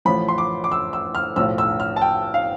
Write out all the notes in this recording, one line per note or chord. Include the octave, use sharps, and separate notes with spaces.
A1 A2 F3 B5
C6
D6
D6
E6
E6
F6
B1 A2 F3 E6
E6
F6
A5
G5
F5